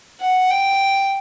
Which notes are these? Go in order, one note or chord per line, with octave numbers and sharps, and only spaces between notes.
F#5
G5